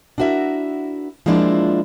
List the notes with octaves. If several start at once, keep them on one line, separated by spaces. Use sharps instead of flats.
D4 E4 F#4 A#4 E5
F3 G#3 A#3 D4 E4 F4